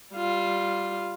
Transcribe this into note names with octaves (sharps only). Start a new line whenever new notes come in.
G3 F4